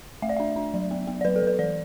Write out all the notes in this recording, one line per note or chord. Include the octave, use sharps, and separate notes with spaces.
A3 E5
D5
D4 E5
D4
F#3
B3
B3
D5
F#3 B4
A4
F#3 B4
E3 D5